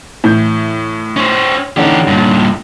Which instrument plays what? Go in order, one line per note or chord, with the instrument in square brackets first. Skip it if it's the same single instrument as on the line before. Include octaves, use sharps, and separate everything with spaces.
[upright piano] A2 E3 G6
[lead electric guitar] C#4 C5
[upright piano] D3 C#4 D#4 [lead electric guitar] E3 G4
[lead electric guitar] G2 A#2